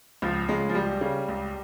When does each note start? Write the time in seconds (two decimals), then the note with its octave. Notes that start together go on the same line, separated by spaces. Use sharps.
0.22 C#2 F3
0.49 C#3 G#3
0.69 F3
0.75 C#2 G3
1.01 C#3
1.29 C#2